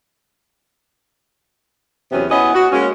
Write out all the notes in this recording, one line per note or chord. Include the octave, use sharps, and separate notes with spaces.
E2 C3 F#3 B3 C#4
B3 C#4 E4 B4 D#5
F#4
G#3 A#3 C#4